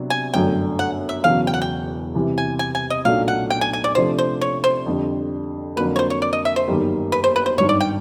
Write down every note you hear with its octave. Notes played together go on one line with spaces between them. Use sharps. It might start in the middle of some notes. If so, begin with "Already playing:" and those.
Already playing: C3 F#3 B3 D4
G#5
G1 F#2 D3 F#3 A3 G5
F#5
E5
E1 E2 C#3 F#3 F5
G5
F#5
G5
C3 E3 G3
G#5
G#5
G#5
D#5
B1 A#2 F#3 A3 D4 F5
F#5
G5
G#5
G#5
D5
C3 F3 A3 D4 C5
C5
C#5
C5
F2 D3 G3
F2 D3 F#3 A#3 B4
C#5
C5
C#5
D5
D#5
E5
C5
G1 F#2 D#3 G3 A#3
B4
C5
B4
C5
G#1 G2 D#3 C#5
D5
G5